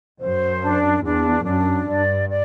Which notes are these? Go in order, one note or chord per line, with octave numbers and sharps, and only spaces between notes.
F#2 C5
D4
E2 D4
F#2 D4
G2 D5
D5